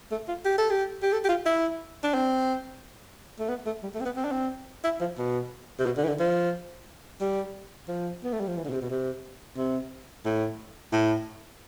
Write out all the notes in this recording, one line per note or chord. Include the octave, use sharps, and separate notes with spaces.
A3
F4
G4
A4
G4
G4
A4
G4
F4
E4
D4
C4
A3
B3
A3
G3
A3
C4
B3
C4
D4
C4
E4
F3
B2
C3
B2
D3
E3
D3
F3
G3
F3
B3
A3
G3
F3
E3
D3
B2
C3
B2
C3
C3
A2
A2